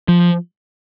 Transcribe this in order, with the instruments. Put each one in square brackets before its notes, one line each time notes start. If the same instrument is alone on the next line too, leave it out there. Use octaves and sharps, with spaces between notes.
[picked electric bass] F3